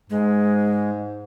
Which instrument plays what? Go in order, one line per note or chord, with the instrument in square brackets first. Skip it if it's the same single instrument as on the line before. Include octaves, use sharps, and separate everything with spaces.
[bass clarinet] G#2 [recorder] G#3